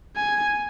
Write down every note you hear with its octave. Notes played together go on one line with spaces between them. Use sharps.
G#5